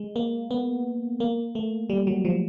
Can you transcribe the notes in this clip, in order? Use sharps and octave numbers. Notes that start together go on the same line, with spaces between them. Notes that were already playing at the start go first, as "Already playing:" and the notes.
Already playing: G#3
A#3
B3
A#3
A3
G3
F#3
F3